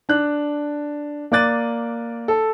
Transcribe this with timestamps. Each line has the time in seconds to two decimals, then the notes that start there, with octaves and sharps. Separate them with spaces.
0.09 D4 F#6
1.32 A#3 D5 D6 F#6 A6 D#7
2.28 A4